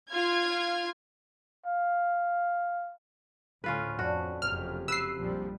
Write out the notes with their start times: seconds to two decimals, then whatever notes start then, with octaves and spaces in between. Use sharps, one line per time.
0.11 F4 F6 G#6
1.66 F5
3.64 D2 A2 C4 C#4 F4 B4
3.99 F2 D4 F#4
4.42 F#1 F2 C3 C4 F6
4.88 B4 E6 C7
5.19 A#1 F3 G3